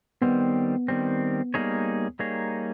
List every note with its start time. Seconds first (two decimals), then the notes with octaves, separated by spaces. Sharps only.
0.22 D#3 G3 B3 C4
0.88 D#3 G3 C4
1.54 G3 A#3 D#4 G#4 C#5
2.19 G3 A#3 D#4 G#4 C#5